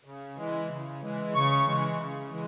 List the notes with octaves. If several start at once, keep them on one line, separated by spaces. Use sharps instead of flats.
C#3
E3 G#3
C#3
E3 G#3
C#3 C#6
E3 G#3
C#3
E3 G#3